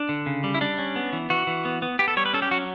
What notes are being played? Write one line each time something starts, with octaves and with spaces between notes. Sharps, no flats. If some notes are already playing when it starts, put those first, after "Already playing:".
Already playing: D4
D3
C#3
G3
E4
G3 D4
C#4
B3
E3
E3 F#4
E3
B3
B3
B3 G4
A4
G3 C#5
B4
C#4 A4
G4
F#3 F#4